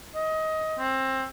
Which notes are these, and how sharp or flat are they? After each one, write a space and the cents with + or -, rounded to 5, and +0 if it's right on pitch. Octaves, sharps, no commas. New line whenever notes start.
D#5 +20
C4 +20